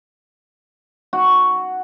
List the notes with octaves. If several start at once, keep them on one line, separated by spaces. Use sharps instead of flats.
F#4